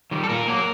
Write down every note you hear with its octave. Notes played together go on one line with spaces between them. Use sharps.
D#3 G3
A4
A#2 A#4
F#3 A#3